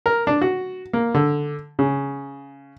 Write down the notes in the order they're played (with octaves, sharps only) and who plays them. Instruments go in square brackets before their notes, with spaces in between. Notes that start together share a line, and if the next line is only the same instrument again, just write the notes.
[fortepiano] A#4
D4
F#4
A#3
D3
C#3